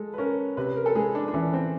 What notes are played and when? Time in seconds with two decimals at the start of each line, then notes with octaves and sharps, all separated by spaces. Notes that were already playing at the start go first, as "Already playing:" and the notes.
Already playing: G#3 A4
0.14 B4
0.18 C#4 A#4
0.57 C3 B4
0.76 A#4
0.86 A4
0.95 G#3 G#4
1.15 D4
1.28 D4
1.34 E3 C#4
1.53 C4